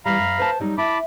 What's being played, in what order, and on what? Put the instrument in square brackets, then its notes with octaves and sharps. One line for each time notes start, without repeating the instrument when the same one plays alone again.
[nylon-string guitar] E3 G3 [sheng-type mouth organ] F5 A#5 B5
[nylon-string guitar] F#2
B4 C5 A5
F#3 G3 D#4
[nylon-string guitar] E4 [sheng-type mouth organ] A5 B5 D6